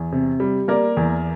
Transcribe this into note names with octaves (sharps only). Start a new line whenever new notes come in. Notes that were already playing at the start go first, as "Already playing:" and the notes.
Already playing: E2
C3
G3
A#3 A#4 D5
E2